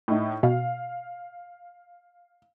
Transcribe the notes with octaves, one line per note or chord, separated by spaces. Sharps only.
A2 D#4 E4
B2 F5